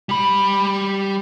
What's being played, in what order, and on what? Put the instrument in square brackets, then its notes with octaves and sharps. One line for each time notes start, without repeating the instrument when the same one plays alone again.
[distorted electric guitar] G3 B5